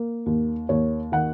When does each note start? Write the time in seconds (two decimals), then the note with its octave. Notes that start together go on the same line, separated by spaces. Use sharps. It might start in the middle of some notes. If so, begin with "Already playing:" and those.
Already playing: A#3
0.26 D#2
0.69 D#2 C#5
1.12 D#3 F#5